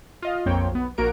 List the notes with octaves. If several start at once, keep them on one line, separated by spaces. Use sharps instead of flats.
F4 D#5 F5
A#1 F2 A#3 C4 C#5 G5
B1 B3
A#1 A#3 F#4 A#4 D7